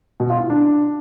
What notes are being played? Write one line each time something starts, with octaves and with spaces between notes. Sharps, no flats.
B2
F4
E4
D4